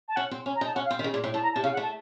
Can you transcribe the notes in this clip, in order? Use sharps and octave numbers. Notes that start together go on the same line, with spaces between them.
A5
C#4 F#5
C4
C#4
A#5
D#4
A5
C#4 F#5
F5
C4
D#3
C#3
A#2
A2
A2 A5
A#5
C3 A5
C#3 F5
F#5
A3
A5